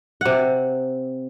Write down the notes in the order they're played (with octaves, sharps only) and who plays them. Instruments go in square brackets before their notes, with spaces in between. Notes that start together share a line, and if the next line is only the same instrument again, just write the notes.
[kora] C3 F#5